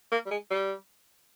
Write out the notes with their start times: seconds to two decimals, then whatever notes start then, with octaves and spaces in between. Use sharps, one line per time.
0.12 A#3
0.26 G3
0.31 G#3
0.50 G3